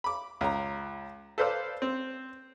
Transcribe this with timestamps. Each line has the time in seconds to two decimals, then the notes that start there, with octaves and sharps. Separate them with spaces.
0.04 B5 D6
0.41 C#2 A#5
1.38 A4 B4 C5 D5 F5
1.82 C4